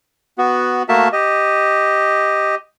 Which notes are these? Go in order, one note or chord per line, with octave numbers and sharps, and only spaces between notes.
B3 F#4
A3 A#3 F#4 A#4 E5 A5
G4 D#5